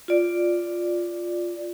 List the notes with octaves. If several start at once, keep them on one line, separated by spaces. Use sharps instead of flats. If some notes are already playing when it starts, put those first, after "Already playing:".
F4 D5